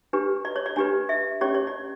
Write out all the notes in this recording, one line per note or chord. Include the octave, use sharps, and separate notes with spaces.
D4 G4 B4
D5
C#5
D5
D4 G4 B4 D5
E5
C#4 G4 C#5 D5
C#5
D5